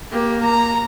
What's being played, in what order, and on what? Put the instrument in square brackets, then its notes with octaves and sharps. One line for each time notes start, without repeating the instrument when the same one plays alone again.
[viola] A#3 [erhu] G4
[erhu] A#5